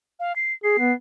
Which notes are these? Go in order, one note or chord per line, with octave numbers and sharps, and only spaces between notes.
F5
C7
G#4 C7
B3